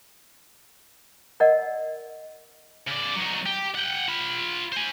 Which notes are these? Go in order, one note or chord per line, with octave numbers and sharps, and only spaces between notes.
A#4 D5 D#5 F#5
C#3 D5
F#3 D#4
G4
F#5 G5
F4 B5
C5 G#5